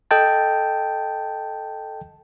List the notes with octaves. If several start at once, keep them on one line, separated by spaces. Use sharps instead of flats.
A4 D#5 G5 A5